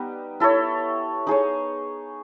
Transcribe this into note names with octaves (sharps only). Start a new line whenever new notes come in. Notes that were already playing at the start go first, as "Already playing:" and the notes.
Already playing: G3 B3 D#4 G4
E4 A4 C#5
D#4 G#4 C#5